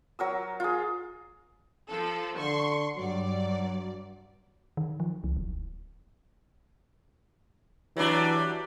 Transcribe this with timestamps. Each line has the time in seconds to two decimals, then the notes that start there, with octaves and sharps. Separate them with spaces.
0.19 F#3 A#4 E6
0.60 F4 G#4
1.88 F3 A4
2.38 D3 C6 C#6
2.97 G2 F#3 D5
4.77 D#3
5.00 F3
5.24 C#2
5.37 D#1
7.97 E3 F#3 G3 D4